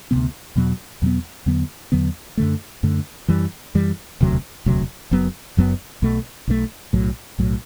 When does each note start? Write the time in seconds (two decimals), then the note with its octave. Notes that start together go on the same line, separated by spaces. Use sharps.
0.11 D2 C3 E3 B3
0.56 E2 B2 F#3 B3
1.02 E2 B2 F#3 B3
1.46 E2 D3 F#3 B3
1.92 E2 D3 F#3 B3
2.37 F#2 D3 A3
2.83 F#2 D3 A3
3.28 F#2 E3 G3
3.75 F#2 E3 G3
4.21 E1 D2 C3 F#3
4.66 E1 D2 C3 F#3
5.11 F#1 F#2 F#3 B3
5.57 F#1 F#2 F#3 B3
6.02 B1 B2 A3
6.48 B1 B2 A3
6.93 B1 A2 F#3
7.39 B1 A2 F#3